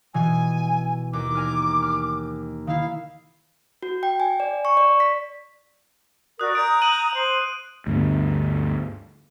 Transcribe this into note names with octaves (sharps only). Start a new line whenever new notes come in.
B2 E3 G#5
D#2 D6
A#4 G#5 F6
F6
D#3 E4 F5
F#4
G5
G#5
D5
C#6
D5
B6
F#4 A#4 D5 D#6 F#6
A#5 D#6 G6 D7
F#6 D#7 F#7
C5
D2 G2 D3 B3